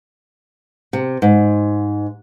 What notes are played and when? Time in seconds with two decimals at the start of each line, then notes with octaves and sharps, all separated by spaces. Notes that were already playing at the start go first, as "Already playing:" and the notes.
0.93 C3
1.22 G#2